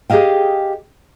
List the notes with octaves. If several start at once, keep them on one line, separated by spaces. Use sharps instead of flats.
G4 G#4 D#5 F5 G5